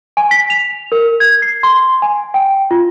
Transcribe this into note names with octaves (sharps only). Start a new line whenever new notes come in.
G#5
B6
F7
A#4
G#6
C7
C6
G#5
G5
F4